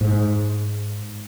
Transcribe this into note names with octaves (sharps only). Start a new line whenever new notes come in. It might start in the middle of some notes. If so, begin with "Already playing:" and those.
G#2